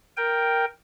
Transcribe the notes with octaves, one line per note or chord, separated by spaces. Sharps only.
A#4 G5